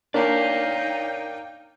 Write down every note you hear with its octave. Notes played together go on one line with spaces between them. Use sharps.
A#3 D4 D#4 C#5 D5 F5 G5 C7